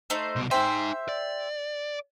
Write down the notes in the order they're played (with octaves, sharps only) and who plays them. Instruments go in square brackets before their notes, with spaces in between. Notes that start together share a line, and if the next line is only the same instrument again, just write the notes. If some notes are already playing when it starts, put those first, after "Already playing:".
[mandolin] A3 D#4 C5
[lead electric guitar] C2 B2
[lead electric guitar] D#4 G#5 [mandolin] G4 C5 E5
[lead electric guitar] D5